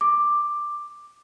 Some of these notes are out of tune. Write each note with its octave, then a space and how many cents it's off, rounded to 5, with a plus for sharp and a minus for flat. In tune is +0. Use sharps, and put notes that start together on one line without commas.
D6 +10